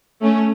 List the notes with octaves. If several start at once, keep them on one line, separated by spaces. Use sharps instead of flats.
A3 C#4